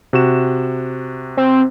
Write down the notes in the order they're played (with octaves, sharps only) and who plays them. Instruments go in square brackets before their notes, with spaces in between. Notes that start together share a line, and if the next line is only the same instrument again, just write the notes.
[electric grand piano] C3 F#4 E7
[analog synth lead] C4